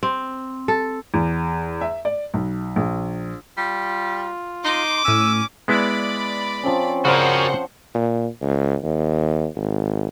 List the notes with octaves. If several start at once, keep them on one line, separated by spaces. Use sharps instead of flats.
C4
A4
E2
E5
D5
B1
A#1
G3 F4
D#4 C6 D6
A2 C#4 E6 D#7
G#3 B3 E4 D5 B5 D6
F3 C4 C#4
C#3 F#4 A#4 C5 D5 F#5 G5
A#2
C#2
D#2
G#1